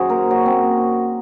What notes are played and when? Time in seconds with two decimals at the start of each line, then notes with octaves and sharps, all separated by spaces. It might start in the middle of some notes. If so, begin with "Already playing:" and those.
Already playing: F#2 D#3 F#4 G#4 C5
0.09 A#3 A#4
0.30 C#3 F#4
0.46 C4
0.52 A#3